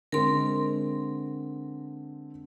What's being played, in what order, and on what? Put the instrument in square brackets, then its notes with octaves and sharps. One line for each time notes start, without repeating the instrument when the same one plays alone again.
[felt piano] D3 G#3 C4 [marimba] A#4 C6